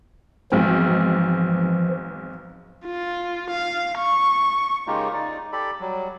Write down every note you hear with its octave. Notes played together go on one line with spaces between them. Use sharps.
B1 G#2 E3 F3 C4
F4
F5
C#6
C#3 G#3 A#3 D#4 F4 G4
D#4 D5
G4 A4 D5 B5
F#3 G3